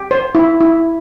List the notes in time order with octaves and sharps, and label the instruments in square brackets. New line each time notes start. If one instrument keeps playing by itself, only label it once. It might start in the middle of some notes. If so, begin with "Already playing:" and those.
Already playing: [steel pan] G4
C5
E4
E4